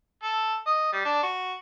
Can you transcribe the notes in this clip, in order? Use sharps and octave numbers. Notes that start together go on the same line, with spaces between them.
A4
D#5
G3
D4
F#4